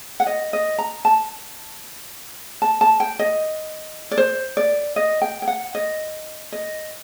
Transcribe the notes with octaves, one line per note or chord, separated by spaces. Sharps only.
F#5
D#5
D#5
A#5
A5
A5
A5
G5
D#5
D5
C5
D5
D#5
G5
G5
F#5
D#5
D#5